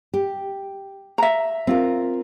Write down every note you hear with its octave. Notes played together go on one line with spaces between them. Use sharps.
G4
E5 A#5
C4 F4 A#4